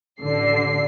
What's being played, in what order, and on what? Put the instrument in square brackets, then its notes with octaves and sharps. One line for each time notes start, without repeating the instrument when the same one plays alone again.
[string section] A1 D3 C7